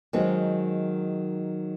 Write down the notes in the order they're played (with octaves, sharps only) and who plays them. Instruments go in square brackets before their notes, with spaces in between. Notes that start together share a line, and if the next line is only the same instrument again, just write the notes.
[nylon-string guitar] D#3 G#3 C4 [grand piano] F#3